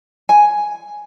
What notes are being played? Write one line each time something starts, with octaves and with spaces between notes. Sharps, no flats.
G#5